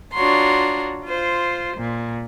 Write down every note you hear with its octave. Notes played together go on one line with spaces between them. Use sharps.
D4 F4 F#4 C#5 A#5 C6
F4 C5
A#2